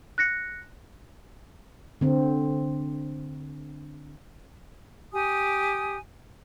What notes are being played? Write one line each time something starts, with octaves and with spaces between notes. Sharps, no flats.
F#6 A#6 C#7
D3 C4
G4 G#5 D#6